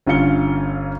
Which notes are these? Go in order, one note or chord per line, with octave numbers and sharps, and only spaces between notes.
G1 C#4 F4 F5 C#7 G7